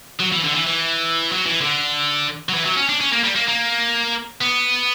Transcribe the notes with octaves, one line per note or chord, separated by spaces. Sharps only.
F#3
E3
D3
E3
E3
F#3
E3
D3
F#3
E3
F#3
C#4
D4
C#4
A#3
G3
A#3
A#3
B3